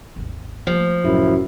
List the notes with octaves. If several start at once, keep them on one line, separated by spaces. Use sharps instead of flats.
G#1 D#2
F3 A3 A#3
C2 F#2 A2 E4